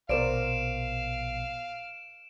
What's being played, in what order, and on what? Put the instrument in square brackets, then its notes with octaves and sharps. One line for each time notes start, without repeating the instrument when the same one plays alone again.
[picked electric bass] A#1 B2 [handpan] A#4 C5 D5 [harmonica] F5 [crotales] D7 E7